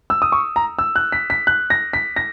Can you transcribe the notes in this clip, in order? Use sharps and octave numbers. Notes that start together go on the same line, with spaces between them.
E6
D#6
C#6
A#5
E6
F#6
B6
B6
F#6
A#6
B6
A#6